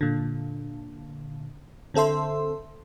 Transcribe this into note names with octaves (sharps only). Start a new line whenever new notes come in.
A#2 D3
D3 C4 A4 E5 C6